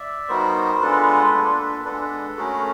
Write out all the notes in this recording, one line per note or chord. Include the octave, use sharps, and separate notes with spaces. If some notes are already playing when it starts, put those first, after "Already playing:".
Already playing: D5 E5
G3 B3 D#4 F#4 A#4 C5
G#3 B3 D4 F4 A4 B4
A#3 D4 F4
G#3 B3 D4 A4 B4
A3 C#4 F#4 G#4 A#4